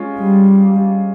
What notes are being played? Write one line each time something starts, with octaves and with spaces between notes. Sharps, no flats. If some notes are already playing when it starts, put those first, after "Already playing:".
Already playing: G#3 C#4 F4
G3